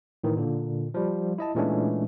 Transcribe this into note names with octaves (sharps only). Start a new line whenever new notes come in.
A2 D#3 E3
A#2 D3
F3 G3
E4 D#5 A5
A#2 E3 G#3 A3 C#4 D4